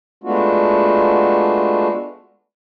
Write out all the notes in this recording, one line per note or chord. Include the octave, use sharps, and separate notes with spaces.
G#3 A3 B3 D4 F4 F#4